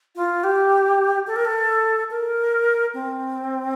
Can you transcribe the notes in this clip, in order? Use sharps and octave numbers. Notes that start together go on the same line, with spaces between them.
F4
G4
A4
A#4
A4
A#4
C4